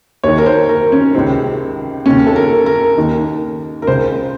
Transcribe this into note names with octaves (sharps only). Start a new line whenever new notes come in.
D#2 D#3 C#5
A#4
C5
A#4
C#4
C#2 C3 D#3 C4
D#2 C#3 C#4
A4
A#4
A#4
D#2 D#3
A#4
C#2 C#3 C5